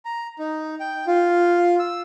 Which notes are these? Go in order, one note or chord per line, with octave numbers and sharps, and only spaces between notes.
A#5
D#4
G5
F4
E6